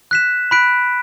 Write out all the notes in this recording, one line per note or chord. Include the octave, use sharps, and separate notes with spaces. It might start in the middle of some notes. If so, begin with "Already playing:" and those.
F#6 B6 E7
B5 F#6 B6 D7